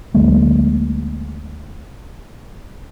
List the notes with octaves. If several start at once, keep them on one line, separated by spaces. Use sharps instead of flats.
D2 F#3 G#3 A#3